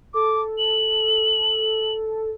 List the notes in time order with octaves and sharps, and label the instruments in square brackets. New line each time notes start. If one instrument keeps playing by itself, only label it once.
[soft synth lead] A4 [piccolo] D6
[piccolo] F#7